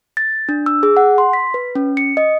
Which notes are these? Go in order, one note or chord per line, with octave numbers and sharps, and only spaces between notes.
A6
D4
E6
G#4
F#5
C6
B6
B4
C#4
C#7
D#5